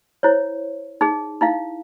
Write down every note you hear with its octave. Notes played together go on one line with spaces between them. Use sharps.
E4 C5 C#5
D#4 G#4
D#4 E4 F5